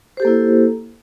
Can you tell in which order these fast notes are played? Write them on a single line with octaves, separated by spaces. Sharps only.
C5 G4 A4 A#3 E4